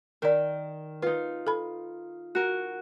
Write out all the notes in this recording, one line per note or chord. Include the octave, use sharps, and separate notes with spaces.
D#3 A#4 D5
D#4 F4 B4
A4 B5
F#4 A#4